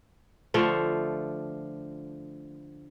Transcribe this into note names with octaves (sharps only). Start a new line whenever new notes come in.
D3 F3 A3